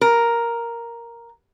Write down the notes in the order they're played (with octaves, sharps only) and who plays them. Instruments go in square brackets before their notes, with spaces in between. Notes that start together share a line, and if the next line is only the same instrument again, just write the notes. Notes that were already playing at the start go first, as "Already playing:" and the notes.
[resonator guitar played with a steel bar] A#4